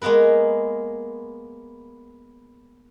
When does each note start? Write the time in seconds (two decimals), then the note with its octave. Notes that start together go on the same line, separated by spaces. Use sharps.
0.02 G#3 A#3 B3 A#4 B4